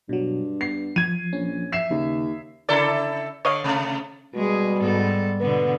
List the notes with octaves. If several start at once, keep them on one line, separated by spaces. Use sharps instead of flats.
G2 B2 F#3
B3 C7
F3 G#6 D#7
A#1 C#4
E5 C7 E7
D#2 C#3
C#3 D4 E4 A4 A#4 D5
D3 C#5 D#5 F5
C3 A3
B2 G3 G#3 G#4
G#2 B3 A4
B2 D3 B3 B4